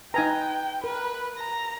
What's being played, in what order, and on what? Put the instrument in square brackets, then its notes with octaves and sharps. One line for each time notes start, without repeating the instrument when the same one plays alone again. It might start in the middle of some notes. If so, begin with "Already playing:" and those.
[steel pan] D#4 G#5 A#5 [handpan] B4 [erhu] G5
[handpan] A#4 [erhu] B4
[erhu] A#5